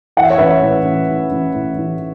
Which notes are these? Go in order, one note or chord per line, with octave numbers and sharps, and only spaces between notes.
E3 F#5
E5
C#5
A1 B4 E5
A2
A1
E3
A1
A2
A1